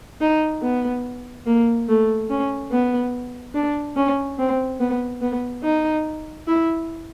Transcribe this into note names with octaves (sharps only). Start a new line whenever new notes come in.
D#4
B3
A#3
A3
C#4
B3
D4
C#4
C4
B3
B3
D#4
E4